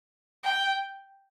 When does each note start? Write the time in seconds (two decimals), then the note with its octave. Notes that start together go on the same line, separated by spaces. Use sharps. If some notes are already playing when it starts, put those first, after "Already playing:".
0.43 G5